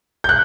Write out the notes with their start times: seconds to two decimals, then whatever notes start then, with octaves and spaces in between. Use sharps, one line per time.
0.24 G6
0.29 F#6